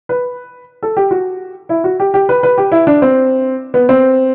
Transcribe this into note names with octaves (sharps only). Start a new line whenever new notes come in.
B4
A4
G4
F#4
E4
F#4
G4
G4
B4
B4
G4
E4
D4
C4
B3
C4